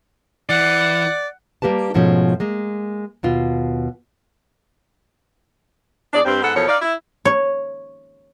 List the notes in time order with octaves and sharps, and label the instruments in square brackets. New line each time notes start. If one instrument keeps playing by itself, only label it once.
[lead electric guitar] E3 [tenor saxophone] D5 [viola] F#5
[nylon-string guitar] G3 A#3 G4 B4 A5
G#2 B2 F3 A3 C#4
G#3 A#3
D#2 B2 F4
[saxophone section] E2 D4 G#4 D5
G2 C4
G#2 B3 A4 F#5
E2 B2 F3 A4 A#4 C#5
D#4 D5 F5
E4
[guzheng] C#5